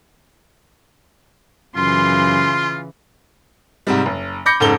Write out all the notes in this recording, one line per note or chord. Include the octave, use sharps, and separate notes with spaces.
F#2 C#3 E3 F4 C6
G#2 C3 G3
F#1
B5 D6 G6 A#6 C#7
F1 G#2 C#3 A4 G7